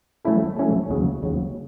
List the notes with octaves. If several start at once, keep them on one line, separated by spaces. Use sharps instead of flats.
F#3 A3 C#4 E4 A4
F#3 A3 C#4 E4 A4
D#2 C#3 F#3
D#2 C#3 F#3